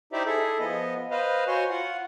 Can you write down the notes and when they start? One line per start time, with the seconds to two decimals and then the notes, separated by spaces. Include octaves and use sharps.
0.13 D#4 E4 G4 C5 D5 E5
0.26 E4 G#4 A4 E5
0.59 F3 B3 D#5
1.11 B4 C5 D#5 F5
1.48 F#4 C5 C#5 G#5 C6 C#6
1.70 F4 F#5